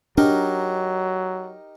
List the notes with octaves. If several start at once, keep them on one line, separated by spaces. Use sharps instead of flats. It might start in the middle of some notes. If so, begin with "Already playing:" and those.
F#3 D4 D#4 G4 A#4